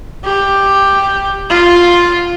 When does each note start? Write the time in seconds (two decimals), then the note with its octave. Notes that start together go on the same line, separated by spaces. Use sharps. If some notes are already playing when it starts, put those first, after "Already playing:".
0.25 G4
1.50 F4